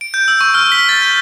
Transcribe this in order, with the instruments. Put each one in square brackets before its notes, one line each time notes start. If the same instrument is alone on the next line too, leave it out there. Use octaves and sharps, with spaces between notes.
[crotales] D7
G6
E6
C#6
F6
B6
A6
G6